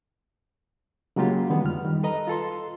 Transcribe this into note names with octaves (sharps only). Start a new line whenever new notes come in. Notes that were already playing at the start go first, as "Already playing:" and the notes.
C#3 F#3 G#3 A#3 F4 G4
D3 D#3 F3 G3 G#3 B3
F2 F6
D#3 G3
A4 B4 D#5 A#5
F4 A4 C6